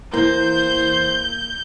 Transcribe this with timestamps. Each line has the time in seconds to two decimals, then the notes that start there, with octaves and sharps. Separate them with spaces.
0.14 E2 E3 A#3 C5 G6